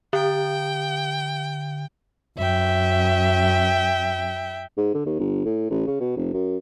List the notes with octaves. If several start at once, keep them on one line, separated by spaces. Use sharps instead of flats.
D3 G5
F#2 E5 G5
G#2
D3
D#2
G1
A2
A1
C#3
B2
F1
F#2